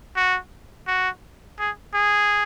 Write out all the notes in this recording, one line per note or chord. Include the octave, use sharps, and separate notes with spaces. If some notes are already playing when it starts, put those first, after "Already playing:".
F#4
F#4
G#4
G#4